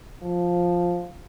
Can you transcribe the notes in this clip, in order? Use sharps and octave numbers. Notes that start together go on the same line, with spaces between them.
F3